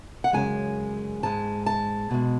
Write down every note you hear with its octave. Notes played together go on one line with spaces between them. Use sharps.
F#5
F#2 C#3 G#3 G#5
G#2 G#3 A5
A5
B2 G#3